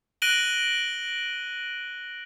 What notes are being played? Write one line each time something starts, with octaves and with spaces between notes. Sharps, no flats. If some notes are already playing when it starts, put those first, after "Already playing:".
F#6 A#6 D7 D#7 F#7 G7